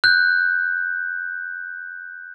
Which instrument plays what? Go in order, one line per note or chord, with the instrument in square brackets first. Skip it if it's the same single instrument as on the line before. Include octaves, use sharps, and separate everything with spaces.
[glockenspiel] F#6 G6